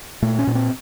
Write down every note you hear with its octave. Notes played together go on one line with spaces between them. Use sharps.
A#2 A3
C#4
A#2
C4